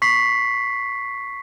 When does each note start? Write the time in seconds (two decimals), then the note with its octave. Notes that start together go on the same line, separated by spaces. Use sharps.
0.02 C#6 B6 C7